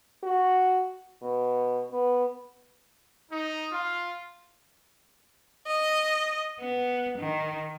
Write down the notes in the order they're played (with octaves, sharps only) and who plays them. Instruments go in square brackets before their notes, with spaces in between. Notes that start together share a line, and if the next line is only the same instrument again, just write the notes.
[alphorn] F#4
B2
B3
[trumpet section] D#4
F4
[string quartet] D#5
B3
D#3